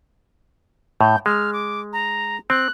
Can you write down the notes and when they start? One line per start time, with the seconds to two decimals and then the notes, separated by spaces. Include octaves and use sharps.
1.01 A2 G6
1.26 G#3 F6
1.53 D6
1.93 A#5
2.50 C4 F#6